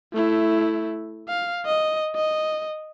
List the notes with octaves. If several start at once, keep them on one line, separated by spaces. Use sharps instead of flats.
A3 E4
F5
D#5
D#5